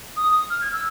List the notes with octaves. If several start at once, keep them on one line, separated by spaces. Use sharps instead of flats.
D#6
F6
G#6
E6